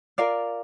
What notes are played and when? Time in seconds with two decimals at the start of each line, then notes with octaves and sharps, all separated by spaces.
0.18 F4 A#4 D5 F5